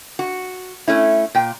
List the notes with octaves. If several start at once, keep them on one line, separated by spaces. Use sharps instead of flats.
F#4
A3 C#4 E4
A#2 G5